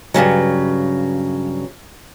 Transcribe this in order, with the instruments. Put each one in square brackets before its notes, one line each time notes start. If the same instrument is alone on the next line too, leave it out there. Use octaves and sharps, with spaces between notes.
[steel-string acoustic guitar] G2 A#2 C#3 F#3